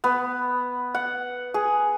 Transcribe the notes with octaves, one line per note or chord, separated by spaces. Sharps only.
B3
F#5
G#4